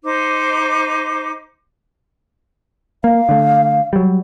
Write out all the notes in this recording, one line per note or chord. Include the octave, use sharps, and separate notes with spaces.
D#4 C5 D6
A#3 F5
D3 A3
F#3 G3